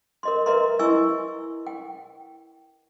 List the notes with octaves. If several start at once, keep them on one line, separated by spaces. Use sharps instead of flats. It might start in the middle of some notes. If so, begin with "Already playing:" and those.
A#4 D#5 C6
A#4 B4 D#5 E5 A#5 C6
E4 D#5 G#5 C#6 E6
G5